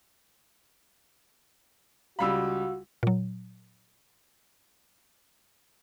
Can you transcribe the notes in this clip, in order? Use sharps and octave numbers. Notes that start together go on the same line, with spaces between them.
C#2 G3 F#4 F5 B5 E6
A#2 F#3